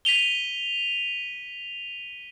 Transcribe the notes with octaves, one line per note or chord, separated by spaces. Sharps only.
B6 D#7 F7 G7